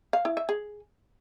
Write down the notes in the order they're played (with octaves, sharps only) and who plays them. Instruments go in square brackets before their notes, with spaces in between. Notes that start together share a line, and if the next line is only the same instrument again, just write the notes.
[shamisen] F5
E4
E5
G#4